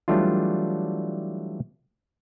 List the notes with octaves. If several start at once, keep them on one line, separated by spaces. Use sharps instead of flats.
E3 F#3 G3 A3 D4 F4